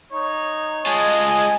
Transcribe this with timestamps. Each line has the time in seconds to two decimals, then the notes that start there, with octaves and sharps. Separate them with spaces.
0.12 D#4 C#5
0.86 G#3 F4 D#5 G#5 A5